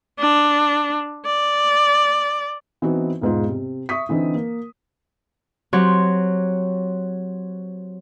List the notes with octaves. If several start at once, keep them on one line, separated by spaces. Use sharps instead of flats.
D4
D5
E3 B3 C4 D#4 E4 F#4
E1 G#2 F4
C3
E5 C#6 D#6 B6
D3 E3 C4 D#4
A#3
F#3 C4 G4 C#5